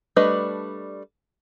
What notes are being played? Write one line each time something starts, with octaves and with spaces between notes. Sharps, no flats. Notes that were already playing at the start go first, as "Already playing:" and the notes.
G3 A3 D4 B4 D#5